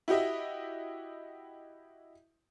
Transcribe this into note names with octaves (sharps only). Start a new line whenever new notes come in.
E4 F#4 G4 D#5 E5